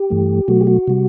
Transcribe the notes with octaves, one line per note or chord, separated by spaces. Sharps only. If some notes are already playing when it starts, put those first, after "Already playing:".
Already playing: G4
G2 E3 A3
B2 F#3 A3 F#4
G4
F#4
C3 G3